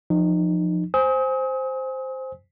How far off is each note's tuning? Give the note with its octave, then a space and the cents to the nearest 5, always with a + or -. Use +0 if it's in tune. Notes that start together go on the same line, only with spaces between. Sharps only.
F3 +10 D#4 -25
C5 +0 G#5 -5 D#6 +40